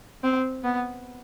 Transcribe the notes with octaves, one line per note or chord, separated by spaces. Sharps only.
C4
B3